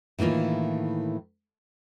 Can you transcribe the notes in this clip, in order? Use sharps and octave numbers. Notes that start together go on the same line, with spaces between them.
A2 D#3 E3 A#3 F4